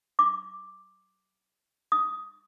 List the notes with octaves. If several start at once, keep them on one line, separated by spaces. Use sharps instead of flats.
D6
D#6